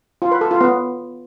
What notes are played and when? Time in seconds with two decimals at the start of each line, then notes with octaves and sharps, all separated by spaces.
0.22 F4
0.31 B4
0.41 A4
0.51 F4
0.61 B3